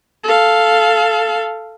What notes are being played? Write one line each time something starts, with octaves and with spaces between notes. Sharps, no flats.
A4 F5